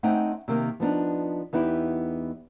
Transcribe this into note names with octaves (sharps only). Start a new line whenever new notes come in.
A3 C4 C#4 D#4 F#5 G5
C3 D#3 A#3
F3 B3 D4 D#4
E2 B3 D#4 E4 G4